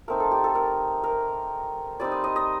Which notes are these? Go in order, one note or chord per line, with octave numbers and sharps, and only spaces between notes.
A3 C4 D#4 A#4
A4
G4
A4
A#4
A#4
G3 C4 D#4 D5
D#5
D#5
D#5